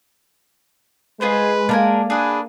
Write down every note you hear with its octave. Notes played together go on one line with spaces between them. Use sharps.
G#3 F4 G#4 B4 C5
A#3 D4 A#4 G#5
D4 G#4 B4